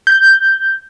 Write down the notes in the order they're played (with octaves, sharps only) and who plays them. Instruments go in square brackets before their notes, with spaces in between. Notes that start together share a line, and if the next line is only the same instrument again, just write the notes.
[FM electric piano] G6